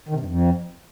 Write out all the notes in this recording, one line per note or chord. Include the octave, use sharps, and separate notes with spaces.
D#3
C3
G2
F2